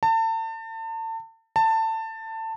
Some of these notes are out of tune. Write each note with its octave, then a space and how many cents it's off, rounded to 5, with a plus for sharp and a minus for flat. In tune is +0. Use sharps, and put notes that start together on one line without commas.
A5 +35
A5 +20